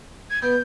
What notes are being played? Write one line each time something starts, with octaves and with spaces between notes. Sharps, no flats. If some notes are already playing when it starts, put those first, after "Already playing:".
G#6
B3 G6